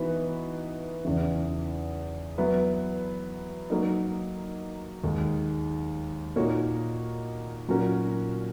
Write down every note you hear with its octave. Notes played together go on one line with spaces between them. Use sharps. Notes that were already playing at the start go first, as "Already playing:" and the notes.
Already playing: E3 B3 D#4 F#4 B4
E2 C#3 E3
F#3 B3 E4 B4
F#3 A#3 D#4
D#2 D#3 G#3
A#2 A#3 D#4 F#4 C#5
A#2 F#3 C#4 F#4 A#4